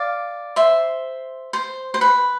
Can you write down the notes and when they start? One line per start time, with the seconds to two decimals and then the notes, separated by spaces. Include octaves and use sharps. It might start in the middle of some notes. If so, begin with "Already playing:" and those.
Already playing: D5 F5
0.56 C5 E5
1.53 C5
1.94 C5
2.01 B4